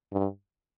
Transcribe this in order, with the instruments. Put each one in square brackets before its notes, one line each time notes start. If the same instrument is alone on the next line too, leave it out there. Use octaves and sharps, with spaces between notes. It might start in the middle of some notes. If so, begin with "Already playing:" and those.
[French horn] G2